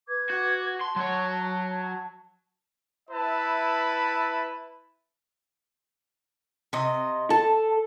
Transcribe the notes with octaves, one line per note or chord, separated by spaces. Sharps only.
B4 D6 G#6
F#4
A5 C6
F#3 C#5
E4 B4 E5 A5
C3 D#5
A4 A5